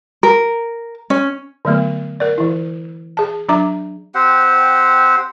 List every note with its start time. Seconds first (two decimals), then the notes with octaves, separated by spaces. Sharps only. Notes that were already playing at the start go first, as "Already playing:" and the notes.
0.23 A#4
1.10 C#4
1.65 D3 F#3 A3 B3
2.20 A#4 D5
2.38 E3 E4
3.17 G#4 A5
3.49 F#3 D4 E5 A#5 D6
4.15 C4 G4 C5 F#5